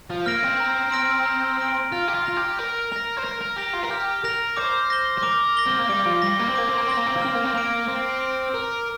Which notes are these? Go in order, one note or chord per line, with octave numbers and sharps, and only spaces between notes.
F3
A#3 F6 A#6 D7
C4
A#5
F6 A#6 D7
A#5
F6 A#6 D7
F4 F6
G4
F4
F4 A#6 F7
G4
A#4 F6
A#4 A#6 F7
C5
A#4 F6
A#4
G4 A#6 F7
F4
A#4
G4 F6
A#4 A#6 F7
C5 D6
A#6 G7
C5
A#4 D6
A#6 G7
C4
A#3
G3 D6
F3
G3 A#6 G7
A#3
C4
A#3 D6
C4
A#3
C4 A#6 G7
A#3
C4
A#3
C4 F6
A#3
C4
A#3 D7 F7
C4 F6
D7 F7
A#4 F6